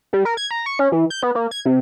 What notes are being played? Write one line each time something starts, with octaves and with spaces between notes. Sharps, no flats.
G3
A#4
G#6
A#5
C#6
C#4
E3
G6
B3
A#3
G#6
C3